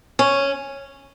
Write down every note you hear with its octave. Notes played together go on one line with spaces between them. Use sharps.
C#4